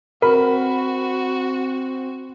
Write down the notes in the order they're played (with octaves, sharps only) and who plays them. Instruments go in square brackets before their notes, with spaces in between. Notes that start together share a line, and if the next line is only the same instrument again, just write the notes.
[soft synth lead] C4 [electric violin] F#4 [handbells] A#4 [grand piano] B5